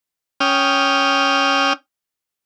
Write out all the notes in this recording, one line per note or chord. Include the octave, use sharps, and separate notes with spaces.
C#4 G5 D#6 F6